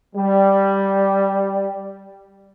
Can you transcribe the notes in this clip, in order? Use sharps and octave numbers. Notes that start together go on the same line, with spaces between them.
G3